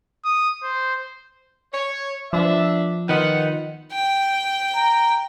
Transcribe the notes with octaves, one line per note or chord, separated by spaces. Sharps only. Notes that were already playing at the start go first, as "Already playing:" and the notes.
D#6
C5
C#5
F3 B3 D4 E5
D#3 B3 D#4 F4 F#5
G5
A#5